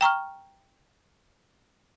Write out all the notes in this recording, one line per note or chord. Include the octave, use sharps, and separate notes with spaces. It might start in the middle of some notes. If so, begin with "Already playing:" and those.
G5 A#5 C#6 F6